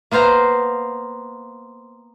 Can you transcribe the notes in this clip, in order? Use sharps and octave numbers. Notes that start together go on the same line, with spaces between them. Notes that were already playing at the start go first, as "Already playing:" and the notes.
A#3 B3 C5 F5 A#5